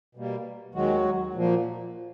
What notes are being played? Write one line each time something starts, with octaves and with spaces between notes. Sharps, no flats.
B2 G3 A#3
D#2 D#3 F#3 G#3 F#4
A#2 F3 A#3